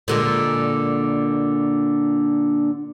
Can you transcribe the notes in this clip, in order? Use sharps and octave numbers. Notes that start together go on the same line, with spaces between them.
A#2 D3 G#3